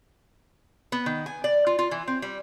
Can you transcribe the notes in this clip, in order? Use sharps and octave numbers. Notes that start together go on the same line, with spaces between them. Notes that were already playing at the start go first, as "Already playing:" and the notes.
B3
D#3
G#5
D5
F4
F4
E3
C4
G3